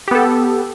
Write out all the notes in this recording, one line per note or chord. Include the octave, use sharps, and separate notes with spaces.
B3 G4 A4